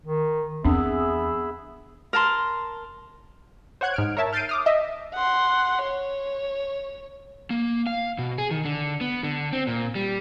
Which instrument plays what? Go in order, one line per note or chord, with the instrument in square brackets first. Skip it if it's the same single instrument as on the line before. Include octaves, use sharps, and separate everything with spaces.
[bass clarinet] D#3
[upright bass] E2 [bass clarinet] B3 [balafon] C4 D4 [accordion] G#4 E5 B5
[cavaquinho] A#4 A5 C6
[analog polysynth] C5 C#5 F#5 F#6 G#6
G#2 F6 D7
A#4 C#5 E5 A5
F6 G6 A6 C7 D7 D#7
D6 D#6 F6
D#5 E5
[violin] F#5 C6
C#5
[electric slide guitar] A#3
F5
B2
G#4
D#3
D3
B3
D3
C4
A#2
G3